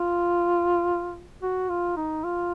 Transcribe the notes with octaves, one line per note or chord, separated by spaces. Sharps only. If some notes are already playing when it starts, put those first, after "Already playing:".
Already playing: F4
F#4
F4
D#4
F4